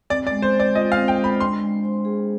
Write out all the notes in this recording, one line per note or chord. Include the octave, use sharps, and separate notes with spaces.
C4 D5
D5
G#3
C5
C5
D5
F4 D#5
F5
C4
G5
G#3
B5
D4 C6
G#3
C5
G#4